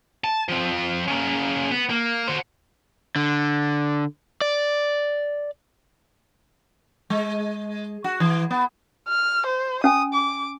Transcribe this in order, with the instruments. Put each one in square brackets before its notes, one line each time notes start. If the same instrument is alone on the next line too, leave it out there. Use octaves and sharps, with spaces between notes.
[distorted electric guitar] A5
F3 C4
C#3 A#3
B3
A#3
F#4 C5
[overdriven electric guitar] D3
D5
[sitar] G#3
F#4
E3
B3
[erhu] F6
C5
[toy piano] C#4 G#5 [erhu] D#6
[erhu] D6